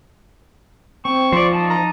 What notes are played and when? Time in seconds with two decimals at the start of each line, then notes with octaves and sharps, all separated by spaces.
1.05 C4 C#6
1.33 F3 C5 D5
1.52 D#4 A5
1.70 A#5